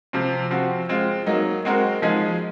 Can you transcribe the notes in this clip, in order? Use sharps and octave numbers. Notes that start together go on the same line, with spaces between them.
C3 F3 C4
F3 C4 F#4
G#3 C4 F4
F#3 A#3 D#4
G#3 C4 F#4 A#4
F3 G#3 D#4 G#4